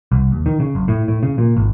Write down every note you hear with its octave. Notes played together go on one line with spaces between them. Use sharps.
C2
D#2
D#3
C#3
F#1
A2
A2
C#3
A#2
G#1